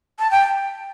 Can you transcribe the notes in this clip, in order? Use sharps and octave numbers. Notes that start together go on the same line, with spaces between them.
A5
G5